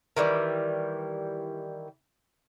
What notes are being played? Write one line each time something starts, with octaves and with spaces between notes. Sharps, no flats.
D#3 E3 G3